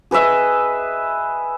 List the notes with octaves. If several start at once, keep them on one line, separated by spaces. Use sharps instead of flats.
G#4 B4 D#5 E5